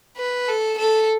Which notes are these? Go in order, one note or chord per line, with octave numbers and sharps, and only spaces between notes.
B4
A4
A4